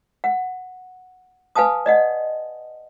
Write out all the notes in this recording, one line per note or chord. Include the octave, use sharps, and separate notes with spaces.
F#5
B4 F5 G#5 A5 D#6
D5 D#5 F#5